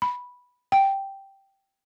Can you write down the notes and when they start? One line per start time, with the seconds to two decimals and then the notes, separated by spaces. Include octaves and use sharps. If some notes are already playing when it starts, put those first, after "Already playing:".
0.02 B5
0.72 G5